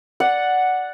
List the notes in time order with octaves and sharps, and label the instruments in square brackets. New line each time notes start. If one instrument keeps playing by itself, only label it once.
[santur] D5 F#5